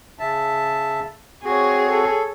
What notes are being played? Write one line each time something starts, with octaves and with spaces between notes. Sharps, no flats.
C#3 E5 A5
C4 F#4 G#4 C#5
A4